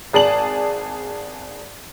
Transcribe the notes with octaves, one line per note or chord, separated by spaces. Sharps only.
G#1 G#4 D5 A5 F#7